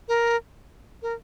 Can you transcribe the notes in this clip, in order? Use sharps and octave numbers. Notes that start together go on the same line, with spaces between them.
A#4
A#4